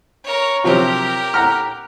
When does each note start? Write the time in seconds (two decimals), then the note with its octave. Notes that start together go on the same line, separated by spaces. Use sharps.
0.24 A#4 C#5
0.64 C3 F3 F#3 G4 A#4
1.34 F#5 A#5 F6